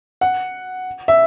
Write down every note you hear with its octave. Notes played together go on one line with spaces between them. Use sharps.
F#5
E5